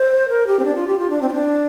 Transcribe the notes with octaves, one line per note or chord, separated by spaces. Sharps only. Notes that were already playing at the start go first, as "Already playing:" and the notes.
Already playing: C5
A#4
G4
C4
D4
F4
G4
F4
D4
C4
F4
D4